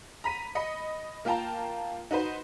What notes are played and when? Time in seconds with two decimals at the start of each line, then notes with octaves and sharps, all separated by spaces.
0.24 A#5 B5 B6 D#7
0.55 D#5 B5 C#7
1.25 A#3 F4 F5 G5 A5 A#5
2.11 D#4 F#4 B4 C5